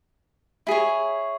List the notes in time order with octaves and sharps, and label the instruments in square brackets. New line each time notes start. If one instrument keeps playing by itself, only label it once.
[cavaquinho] E4 G#4 C#5